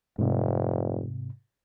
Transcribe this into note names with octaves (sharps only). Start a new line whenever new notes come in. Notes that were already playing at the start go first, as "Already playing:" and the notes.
F1 G#2 C3